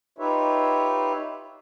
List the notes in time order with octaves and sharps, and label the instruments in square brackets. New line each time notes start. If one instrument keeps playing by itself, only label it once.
[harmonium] D#4 F4 G4 B4 C#5 E5